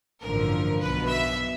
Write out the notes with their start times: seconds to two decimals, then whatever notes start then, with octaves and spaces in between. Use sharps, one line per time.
0.22 A1 G2 D3 F3 A#4
0.80 B1 B2 B4
1.09 E5